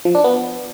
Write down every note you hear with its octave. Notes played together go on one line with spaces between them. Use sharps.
F3
D4
B3